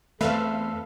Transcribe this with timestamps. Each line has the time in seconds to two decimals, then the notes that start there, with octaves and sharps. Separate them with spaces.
0.21 E2 A3 C4 A4 B4 C5 E5 F5